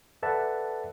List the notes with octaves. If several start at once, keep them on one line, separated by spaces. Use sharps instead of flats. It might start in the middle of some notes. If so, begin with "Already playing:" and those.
A4 B4 D5 E5 F#5 A5